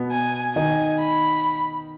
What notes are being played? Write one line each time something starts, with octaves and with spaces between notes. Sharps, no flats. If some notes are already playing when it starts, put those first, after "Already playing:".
Already playing: B2 B3
G#5
D#3 D#4 G#5
B5